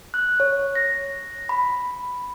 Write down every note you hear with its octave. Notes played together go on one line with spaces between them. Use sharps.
F#6
C#5
A#6
B5